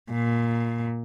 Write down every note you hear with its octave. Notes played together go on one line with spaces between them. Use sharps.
A#2